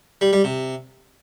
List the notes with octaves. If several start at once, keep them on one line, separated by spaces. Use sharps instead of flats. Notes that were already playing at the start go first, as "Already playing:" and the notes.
G3
G3
C3